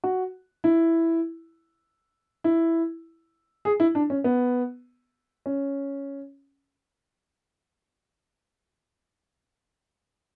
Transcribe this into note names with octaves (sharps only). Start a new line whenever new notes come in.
F#4
E4
E4
G#4
E4
D4
C#4
B3
C#4